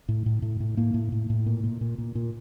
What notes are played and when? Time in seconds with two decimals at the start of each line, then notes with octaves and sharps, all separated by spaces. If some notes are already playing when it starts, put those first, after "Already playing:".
0.09 A2
0.26 A2
0.42 A2
0.60 A2
0.77 A2 A#3
0.94 A2
1.12 A2
1.30 A2
1.46 A#2
1.64 A#2
1.81 A#2
1.98 A#2
2.15 A#2